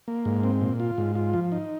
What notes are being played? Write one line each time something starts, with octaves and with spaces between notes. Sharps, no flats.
A#3
G#2
C4
A#2
F4
G#2
F4
F3
D#4